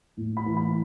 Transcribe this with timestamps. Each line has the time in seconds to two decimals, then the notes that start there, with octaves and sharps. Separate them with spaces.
0.17 A2
0.37 B5
0.46 E3
0.57 B5